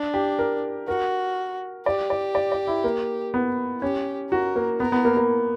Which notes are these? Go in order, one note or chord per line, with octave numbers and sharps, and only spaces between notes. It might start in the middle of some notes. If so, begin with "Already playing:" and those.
Already playing: D4
G4
A#4
F#4 A#4
G4 D5
D5
D5
D5
E4
A#3
B3
C#4 G4
F#4 A#4
A#3
B3 A#4
B3
A#3
A#3